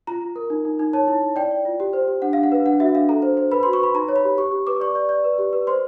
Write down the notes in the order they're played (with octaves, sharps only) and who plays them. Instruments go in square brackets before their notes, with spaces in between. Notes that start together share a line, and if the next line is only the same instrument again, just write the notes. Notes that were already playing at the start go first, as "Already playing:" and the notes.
[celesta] F4 A#5
F4
A#4
D#4
D#4
D#4
C#5 A5
E4
E4
D5 G5
D5
F4
G4
C5
G4
D4 F#5
F5
D4
F#5
B4 F5
D4 F#5
F#4 E5
D4 F5
A4 A#5
C5
C5
B4 B5
F#4 C6
C#6
B4 B5
D#4 A#5
C#5
B5
G4
G4 C#6
G4
B4 D6
D5 C#6
D5
D5
B4
G4
B4
C5 C6